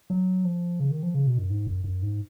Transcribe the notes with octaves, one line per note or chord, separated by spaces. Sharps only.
F#3
F3
C#3
D#3
F3
C#3
B2
F#2
G#2
F#2
F#2
G#2